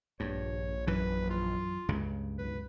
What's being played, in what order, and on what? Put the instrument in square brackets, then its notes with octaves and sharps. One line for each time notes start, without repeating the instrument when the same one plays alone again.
[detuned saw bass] A#1 [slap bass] G2 [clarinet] C#5
[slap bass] F#2 E3 [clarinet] B4
[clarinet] F4
[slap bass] C#2 G2 C#3
[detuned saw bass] B1 [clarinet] B4